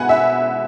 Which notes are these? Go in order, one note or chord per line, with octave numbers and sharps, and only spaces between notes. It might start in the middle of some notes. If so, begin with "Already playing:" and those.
Already playing: B2 G#3 E4 F#5 G#5 B5
E5